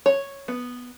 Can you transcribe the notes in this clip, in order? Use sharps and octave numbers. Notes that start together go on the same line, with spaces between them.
C#5
B3